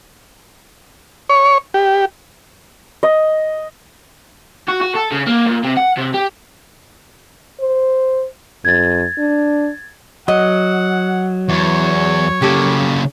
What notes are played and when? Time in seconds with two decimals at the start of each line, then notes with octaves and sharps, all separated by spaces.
1.29 C#5
1.74 G4
3.03 D#5
4.69 F#4
4.81 F#4
4.95 A4
5.12 C#3
5.27 A#3
5.46 A#2
5.63 C3
5.77 F#5
5.97 C3
6.14 G4
7.60 C5
8.65 F2 G#6 A6
9.18 D4
10.28 F#3 D#5 F#5
11.49 E2 C#5
12.42 C#3 A#3 G4 A4